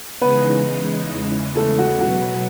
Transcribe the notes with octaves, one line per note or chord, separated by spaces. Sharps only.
C#3 E3 G#3 B3 D#4 B4
E2 C#3 E3 G#3
A3 A4
F#4
B2 F#3 B3 F#4